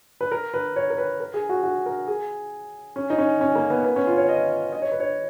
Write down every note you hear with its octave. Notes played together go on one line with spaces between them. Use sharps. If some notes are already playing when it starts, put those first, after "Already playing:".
B4
A#4
B4
C#5
A#4
B4
A#4
G#4
F#4
F#4
A#4
G#4
C#4
D#4
C#4
C#4
A#3
B3
B3
C#4
F4
C#5
D#5
D#5
C#5
B4
C#5